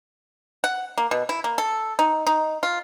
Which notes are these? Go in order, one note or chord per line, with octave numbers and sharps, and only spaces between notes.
F#5
A#3
B2
E4
A#3
A4
D#4
D#4
F4